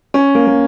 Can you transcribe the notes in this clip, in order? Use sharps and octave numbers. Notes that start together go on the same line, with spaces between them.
C#4
A#3
A#3